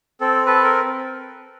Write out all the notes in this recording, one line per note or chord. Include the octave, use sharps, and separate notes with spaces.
C4 A4
A4 B4
A#4